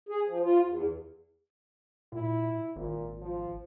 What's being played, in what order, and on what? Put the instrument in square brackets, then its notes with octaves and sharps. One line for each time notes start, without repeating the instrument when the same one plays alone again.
[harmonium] G#4
F3
F4
E2
[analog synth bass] A#2 [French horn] E4
[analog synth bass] G#1 [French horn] A#2
[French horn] F3